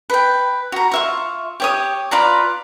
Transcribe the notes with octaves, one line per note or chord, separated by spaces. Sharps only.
B4 G5
F#4 A#5
F4 E5 C#6
G4 C#5 D#6
F4 B4 D5 A#5